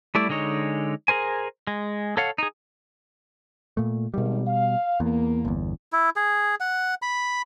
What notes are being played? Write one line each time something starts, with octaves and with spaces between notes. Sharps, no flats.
G3 A3 E4 D5
D3 G#3 D#4 C#5
G#4 A#4 C5 G#5
G#3
A4 C#5 F5 F#5
D#4 G#4
A#2 A3
G#1 B2 D#3 G3
F5
E2 A#3
G1 E2
E4
G#4
F#5
B5